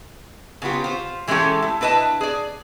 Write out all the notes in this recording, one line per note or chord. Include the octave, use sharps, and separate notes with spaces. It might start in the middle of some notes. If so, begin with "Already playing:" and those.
C#3 F#3 B3 F4 G4
F4 C5
E3 G#3 A3 C#4 G4 A4
E4
D4 E4 B4 D#5 A5
G#4 D5